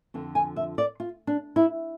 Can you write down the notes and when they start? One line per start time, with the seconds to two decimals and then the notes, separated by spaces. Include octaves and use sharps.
0.14 F2 D3 F3
0.35 G#5
0.56 E5
0.78 D5
1.00 F4
1.27 D4
1.56 E4